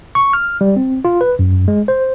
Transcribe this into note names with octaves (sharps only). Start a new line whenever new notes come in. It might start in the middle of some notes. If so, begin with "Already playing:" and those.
C#6
F6
G3
C4
F4
B4
F#2
G#3
C5